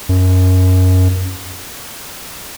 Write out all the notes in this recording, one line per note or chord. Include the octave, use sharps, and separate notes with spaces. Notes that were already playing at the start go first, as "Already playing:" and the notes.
F#2